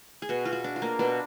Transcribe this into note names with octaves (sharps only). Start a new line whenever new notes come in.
G#4
B2 F#4
B2 F4
F#4
D4
F4
A#3
B2 D4